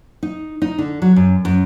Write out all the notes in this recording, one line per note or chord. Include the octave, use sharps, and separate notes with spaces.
D#4
D#4
D3
F#3
F#2
F#2